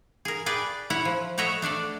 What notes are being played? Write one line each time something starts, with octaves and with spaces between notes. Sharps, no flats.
G#4 A#4
G#4 B4 D5 G5
E4 C#5 F#5
F3
A3 F#4 C#5 D#5 E5
A3 D4 A4 D5